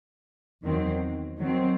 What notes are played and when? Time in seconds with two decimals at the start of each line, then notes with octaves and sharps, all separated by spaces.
0.63 E2 D#3 F#3 C4
1.40 D#3 F#3 C4